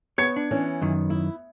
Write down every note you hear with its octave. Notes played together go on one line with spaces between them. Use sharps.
B3 C#5 G#6 C#7
D4
E3 C#4
F#2 D#3
E4